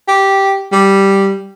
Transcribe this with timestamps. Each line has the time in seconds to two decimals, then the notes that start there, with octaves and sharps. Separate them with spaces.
0.08 G4
0.72 G3